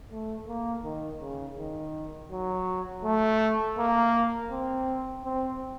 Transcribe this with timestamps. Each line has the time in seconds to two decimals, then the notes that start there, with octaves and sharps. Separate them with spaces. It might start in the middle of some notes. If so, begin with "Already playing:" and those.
0.11 A3
0.47 A#3
0.83 D#3
1.21 C#3
1.58 D#3
2.31 F#3
3.04 A3
3.78 A#3
4.50 C4
5.24 C4